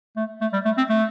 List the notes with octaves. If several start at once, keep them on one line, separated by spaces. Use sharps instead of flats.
A3
A3
G3
A3
C4
A3